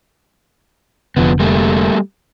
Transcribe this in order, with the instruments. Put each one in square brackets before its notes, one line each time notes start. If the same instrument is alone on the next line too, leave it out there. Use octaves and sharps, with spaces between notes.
[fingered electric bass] F1 D3 [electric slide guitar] F3 B3
[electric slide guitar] G3 A3 A#3